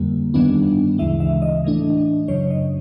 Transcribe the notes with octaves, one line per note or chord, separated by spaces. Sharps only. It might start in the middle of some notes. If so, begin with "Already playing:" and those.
Already playing: F2 D3 G3 A#3
G2 D#3 G3 B3 D4
D2 C#3 E3 G#3 E5
E5
D#5
A2 E3 A3 D4
F#2 C#3 F#3 C#5
D#5